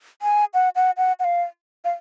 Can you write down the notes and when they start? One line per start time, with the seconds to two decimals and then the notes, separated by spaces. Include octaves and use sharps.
0.22 G#5
0.54 F#5
0.76 F#5
0.97 F#5
1.20 F#5
1.24 F5
1.85 F5